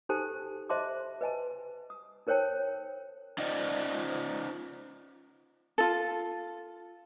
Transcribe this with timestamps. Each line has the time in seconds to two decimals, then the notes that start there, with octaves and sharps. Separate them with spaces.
0.09 D#4 G4 A4 C5 G#5 A5
0.69 C5 D#5 E5 A5 C6 D6
1.21 B4 D#5 G#5 A5
1.90 D#6
2.27 D#4 A#4 C5 C#5 G5 A5
3.38 C#4 D#4 F4 C5 D5 D#5
5.78 F4 A4